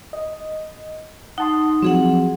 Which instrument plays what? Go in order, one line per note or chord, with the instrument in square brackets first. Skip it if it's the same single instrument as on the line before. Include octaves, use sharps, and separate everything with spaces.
[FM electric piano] D#5
[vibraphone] D#4 [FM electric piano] F#5 A5 C6
[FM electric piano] F3 F#3 [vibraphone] C4 G#4 F#5